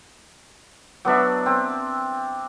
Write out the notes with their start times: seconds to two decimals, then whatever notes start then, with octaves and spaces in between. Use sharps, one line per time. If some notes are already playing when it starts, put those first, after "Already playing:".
1.05 F#3 B3 D4 E5
1.46 C4